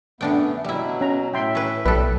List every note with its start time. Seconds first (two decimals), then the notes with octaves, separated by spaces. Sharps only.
0.21 F#2 D3 A3 B3 D4 G5
0.64 B2 F#3 G3 E4
1.01 C#4 A#5
1.34 A2 E5 G5 C6
1.55 C#4 B4
1.85 B1 G3 A4 B4